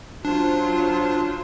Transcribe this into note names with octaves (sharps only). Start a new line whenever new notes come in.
F#3 D4 F4 C5